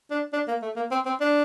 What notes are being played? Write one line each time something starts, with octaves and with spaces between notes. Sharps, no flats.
D4
D4
A#3
A3
A#3
C4
C4
D4